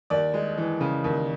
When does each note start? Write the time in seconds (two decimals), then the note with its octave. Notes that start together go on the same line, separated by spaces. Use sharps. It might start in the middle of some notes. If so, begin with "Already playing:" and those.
0.10 D#2 D5
0.34 G#3
0.58 E3
0.81 C#3
1.04 D#2